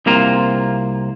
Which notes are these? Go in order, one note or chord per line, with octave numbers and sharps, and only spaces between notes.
C2 C3 A#3 F4 C5 A#5